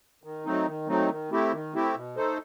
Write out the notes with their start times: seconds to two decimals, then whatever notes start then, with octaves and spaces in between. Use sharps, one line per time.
0.24 D#3
0.45 F#3 A3 C4 D#4
0.67 D#3
0.88 F#3 A3 C4 D#4
1.09 D#3
1.31 A3 C4 E4 G4
1.52 D#3
1.73 A3 C4 E4 G4
1.95 B2
2.16 A3 D#4 A4 C5